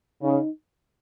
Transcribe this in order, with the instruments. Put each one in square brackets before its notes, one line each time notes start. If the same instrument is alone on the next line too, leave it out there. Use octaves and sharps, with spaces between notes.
[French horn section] C#3 [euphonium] D#4